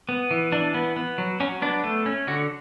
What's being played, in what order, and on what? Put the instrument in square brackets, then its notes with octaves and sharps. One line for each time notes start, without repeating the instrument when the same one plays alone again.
[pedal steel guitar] B3
E3
E3 D4
B3
B3
F#3
F#3 C#4
B3 D4
A3
C#4
D3 F#4